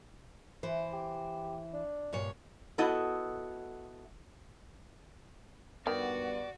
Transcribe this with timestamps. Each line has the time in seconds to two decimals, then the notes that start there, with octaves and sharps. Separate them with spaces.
0.63 E3 C5
0.93 G4
1.73 D4
2.13 G2 A#2 C#5
2.78 B3 E4 F#4 A4 D#5
5.87 G2 D#3 B3 F#4 D5